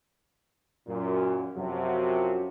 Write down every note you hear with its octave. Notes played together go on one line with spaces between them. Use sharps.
F#2 A#2
F#2 C3 F3 F#3